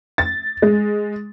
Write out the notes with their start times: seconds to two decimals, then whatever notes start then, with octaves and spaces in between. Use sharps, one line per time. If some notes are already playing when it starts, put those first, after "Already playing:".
0.18 A6
0.62 G#3